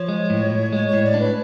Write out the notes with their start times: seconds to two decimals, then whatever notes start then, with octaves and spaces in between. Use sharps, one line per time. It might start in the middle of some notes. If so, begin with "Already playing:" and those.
Already playing: F3 C#5
0.09 G#3
0.30 A2
0.51 A2
0.73 G#3 C#5
0.88 C#5
0.93 A2
1.04 D5
1.14 D4
1.19 B4